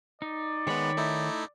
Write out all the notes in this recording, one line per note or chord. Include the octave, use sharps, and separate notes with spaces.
D#4 D5
D#3 G#3 B3 C#5 B5
A3 D#4 E4